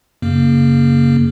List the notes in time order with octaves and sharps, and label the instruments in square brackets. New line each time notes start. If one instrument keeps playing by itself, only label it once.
[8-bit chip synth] F#2 C#3 A#3